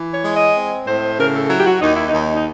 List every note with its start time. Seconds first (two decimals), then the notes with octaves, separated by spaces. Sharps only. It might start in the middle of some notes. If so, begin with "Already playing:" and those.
Already playing: E3
0.13 C#5
0.24 G#3
0.34 D#5
0.55 C4
0.87 A2 C5
1.18 C#3 A#4
1.29 A#4
1.35 A4
1.50 F#3 E4
1.59 G4
1.66 F#4
1.81 D#2 D#4
1.94 E4
2.07 D#4
2.13 D#2
2.36 D#4